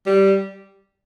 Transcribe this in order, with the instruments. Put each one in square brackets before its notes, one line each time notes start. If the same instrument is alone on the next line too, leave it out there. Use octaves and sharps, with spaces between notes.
[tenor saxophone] G3